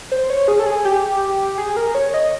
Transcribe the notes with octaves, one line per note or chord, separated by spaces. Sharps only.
C5
C#5
G#4
A4
G#4
G4
G#4
A#4
C#5
D#5